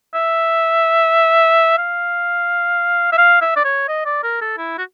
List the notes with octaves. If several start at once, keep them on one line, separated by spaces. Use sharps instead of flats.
E5
F5
E5
F5
E5
D5
C#5
D#5
D5
A#4
A4
E4
F#4